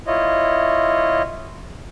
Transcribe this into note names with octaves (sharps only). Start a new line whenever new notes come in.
E4 F4 C#5 D#5